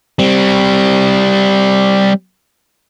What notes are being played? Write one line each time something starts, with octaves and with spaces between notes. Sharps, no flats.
G3 C4